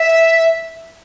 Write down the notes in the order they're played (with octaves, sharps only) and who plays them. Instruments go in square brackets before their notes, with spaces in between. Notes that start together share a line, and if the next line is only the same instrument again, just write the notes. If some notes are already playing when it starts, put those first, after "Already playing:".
Already playing: [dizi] E5